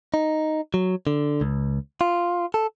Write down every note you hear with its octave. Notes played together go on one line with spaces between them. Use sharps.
D#4
F#3
D3
C#2
F4
A4